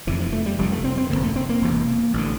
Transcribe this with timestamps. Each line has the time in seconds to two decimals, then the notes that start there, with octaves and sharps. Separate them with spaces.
0.07 F1 F2 C3 E3
0.20 F3
0.33 A3
0.46 G3
0.58 F1 F2 C3 G3
0.72 A3
0.84 C4
0.97 C4
1.10 F1 F2 D3 A#3
1.23 A3
1.36 C4
1.49 A#3
1.62 E1 E2 C3
2.14 A1 D3